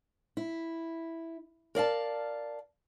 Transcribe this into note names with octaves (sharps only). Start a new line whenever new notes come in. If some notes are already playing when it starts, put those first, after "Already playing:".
E4
A#4 D5 F5 A5